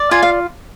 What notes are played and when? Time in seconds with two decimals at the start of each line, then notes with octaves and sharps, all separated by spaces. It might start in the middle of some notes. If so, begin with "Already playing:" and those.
Already playing: D5
0.11 F4 G#5
0.23 F5